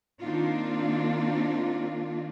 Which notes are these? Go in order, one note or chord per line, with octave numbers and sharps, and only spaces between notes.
D#3 A#3 C4 D4 D#4 F4